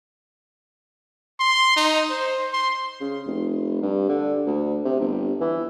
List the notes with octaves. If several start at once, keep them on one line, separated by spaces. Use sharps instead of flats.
C6
D#4
C5
C6
C#3
F1
G2
D3
D2
C3
G1
E3